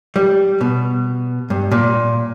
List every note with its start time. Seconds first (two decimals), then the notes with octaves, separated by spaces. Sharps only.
0.16 G3
0.61 B2
1.50 G2
1.71 A#2